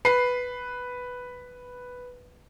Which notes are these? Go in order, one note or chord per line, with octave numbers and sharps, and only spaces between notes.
B4 C7